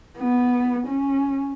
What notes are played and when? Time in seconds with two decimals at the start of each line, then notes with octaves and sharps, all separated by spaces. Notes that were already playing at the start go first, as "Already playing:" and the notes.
0.18 B3
0.87 C#4